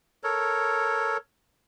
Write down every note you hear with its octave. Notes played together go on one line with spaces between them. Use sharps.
A4 A#4 C#5